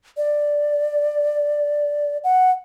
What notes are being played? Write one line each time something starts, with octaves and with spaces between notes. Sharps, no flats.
D5
F#5